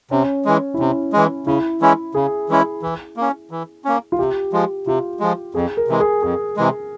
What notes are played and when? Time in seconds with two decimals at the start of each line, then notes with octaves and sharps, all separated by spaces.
0.11 C3 C#4
0.45 E3 G#3
0.74 E4
0.79 C3 C#4
1.13 E3 G#3
1.47 C#3 E4
1.81 E3 G#3 C#4 E4
2.14 C#3 G#4
2.49 E3 G#3 C#4 E4
2.82 E3
3.17 A#3 C#4
3.51 E3
3.85 A#3 C#4
4.12 F4
4.19 C3 G4
4.53 F3 G#3
4.87 C3 F4
5.20 F3 G#3
5.54 F2 G#4
5.77 A#4
5.88 C3 E3 G#3
6.00 G#4
6.23 F2 G#4
6.57 C3 E3 G#3